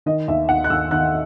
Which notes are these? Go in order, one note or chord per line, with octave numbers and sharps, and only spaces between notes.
D#3 D#5
D#2 E5
D#2 F#5
F#6
D#2 E6
D#3 F#6